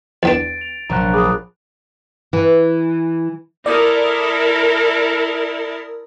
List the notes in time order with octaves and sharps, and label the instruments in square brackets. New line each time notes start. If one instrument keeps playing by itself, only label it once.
[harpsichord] E2 B3 D4 [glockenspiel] A6 D7
[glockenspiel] F7
[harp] A#1 F3 F#3 [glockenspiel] A#5 C#6 F#6
[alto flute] G#4 [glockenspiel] G#5 B5 D6
[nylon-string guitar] E3
[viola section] E4 A4 A#4 [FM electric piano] D5 D#6